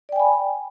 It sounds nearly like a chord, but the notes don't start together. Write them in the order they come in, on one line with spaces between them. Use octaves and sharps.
D5 G5 G#5 B5